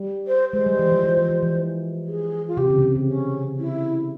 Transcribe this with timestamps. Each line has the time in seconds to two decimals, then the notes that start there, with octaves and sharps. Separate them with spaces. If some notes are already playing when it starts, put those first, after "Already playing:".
Already playing: G3
0.27 C5
0.53 G#3 C5
0.66 G3
0.79 E3
0.92 F3
1.04 F3
1.17 E3
1.29 E3
1.42 E3
2.07 G#4
2.48 F4
2.57 C3 G4
2.70 C#3
2.78 C3
2.82 C#3
2.95 C#3
3.07 C#4
3.59 E4